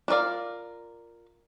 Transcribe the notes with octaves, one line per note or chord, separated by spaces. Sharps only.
D4 F4 A#4 D5 F5